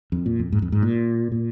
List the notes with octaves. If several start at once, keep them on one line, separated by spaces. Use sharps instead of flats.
F2
A#2
F2
G#2
F2
G#2
A#2
A#2